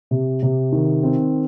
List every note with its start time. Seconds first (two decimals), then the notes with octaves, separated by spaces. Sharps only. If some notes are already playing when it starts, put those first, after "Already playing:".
0.11 C3
0.42 C3
0.72 D#3
1.03 C4